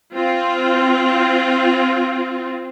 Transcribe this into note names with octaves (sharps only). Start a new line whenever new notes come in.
C4 F4